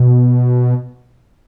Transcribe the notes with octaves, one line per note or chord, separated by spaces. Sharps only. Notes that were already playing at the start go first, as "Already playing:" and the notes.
Already playing: B2